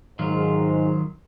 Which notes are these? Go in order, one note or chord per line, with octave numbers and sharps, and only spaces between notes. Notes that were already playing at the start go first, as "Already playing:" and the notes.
G#2 D#3 F#3 F4